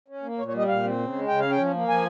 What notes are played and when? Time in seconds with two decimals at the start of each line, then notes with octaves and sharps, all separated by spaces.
0.08 C#4
0.23 A#3
0.38 A#2 C#5
0.48 C#5
0.53 G3 D#5
0.68 A#2 F5
0.83 C4
0.99 C#3
1.13 G#3
1.28 C#3 G5
1.40 C#4 F5
1.51 G5
1.58 F3
1.73 A#3
1.88 F3 G#5